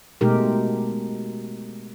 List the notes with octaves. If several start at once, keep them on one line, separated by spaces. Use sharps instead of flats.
B2 G#3 A3 D#4 G4 A#4